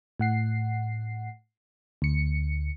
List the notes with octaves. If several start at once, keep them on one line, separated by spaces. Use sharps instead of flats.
A2 F#5 C7
D2 C#7